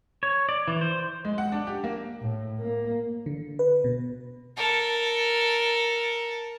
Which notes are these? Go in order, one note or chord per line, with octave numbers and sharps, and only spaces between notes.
C#5
D5
E3
C5
G#3
F#5
D4
G4
A#3
A2
A#3
D3
B4
B2
A4 A#4